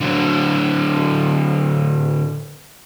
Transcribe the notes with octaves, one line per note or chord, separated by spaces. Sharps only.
D3 F#3